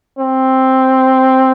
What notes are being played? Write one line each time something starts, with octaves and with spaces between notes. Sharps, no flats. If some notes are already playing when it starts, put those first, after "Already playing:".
C4